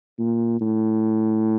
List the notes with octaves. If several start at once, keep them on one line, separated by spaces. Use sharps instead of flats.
A#2
A2